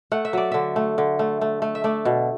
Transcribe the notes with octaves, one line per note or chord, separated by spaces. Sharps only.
A3 F#5
E5
F#3 D5
D3 E5
A3
D3
A3
A3
A3
E5
A3 D5
B2